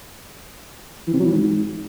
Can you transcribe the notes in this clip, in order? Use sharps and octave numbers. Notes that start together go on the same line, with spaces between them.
E3
C3
F#3
E3
G#2